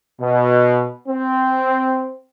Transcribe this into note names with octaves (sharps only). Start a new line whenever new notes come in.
B2
C4